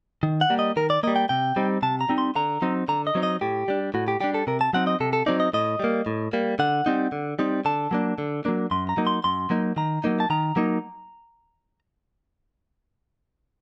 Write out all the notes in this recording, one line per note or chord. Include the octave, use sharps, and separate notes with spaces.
D#3
F#5
G3 A#3
D#5
D#3 A#4
D5
G3 A#3 D#5
G5
C3 G5
G3 C4 D#4
C3 A5
A#5
G3 C4 D#4
C6
D3 A#5
F#3 C4 D#4
D3 A#5
D#5
F#3 C4 D#4
D#5
A2 G4
G3 D4
A2 F#4
G4
G3 D4 G4
A4
C3 A#4
A5
F#3 C4 D#4 F#5
D#5
C3 A4
A4
F#3 C4 D#4 D5
D#5
A2 D#5
G3 A#3
A2
G3 A#3
D3 F#5
G3 C4 D#4
D3
G3 C4 D#4
D3 A5
F#3 A#3 D4
D3
F#3 A#3 D4
F#2 C6
A#5
F#3 A#3 D#4
C6
F#2 C6
F#3 A#3 D#4
D#3 A#5
F#3 A#3 D#4
A5
D#3 A#5
F#3 A#3 D#4